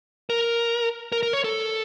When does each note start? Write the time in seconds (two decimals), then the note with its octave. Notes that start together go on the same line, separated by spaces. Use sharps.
0.30 A#4
1.12 A#4
1.23 A#4
1.33 C#5
1.44 A4